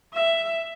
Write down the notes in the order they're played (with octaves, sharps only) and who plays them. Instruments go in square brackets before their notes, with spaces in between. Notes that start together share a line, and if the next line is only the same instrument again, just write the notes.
[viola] E5